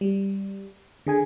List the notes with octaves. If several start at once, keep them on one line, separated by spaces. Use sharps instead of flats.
G3
D3 G#4 G#5